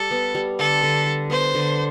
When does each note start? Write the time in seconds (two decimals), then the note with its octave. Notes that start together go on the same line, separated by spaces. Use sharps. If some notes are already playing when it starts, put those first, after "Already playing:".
Already playing: G3 A4
0.11 B3
0.35 G3
0.59 D3 A4
0.83 D3
1.06 G3
1.30 B3 C5
1.55 D3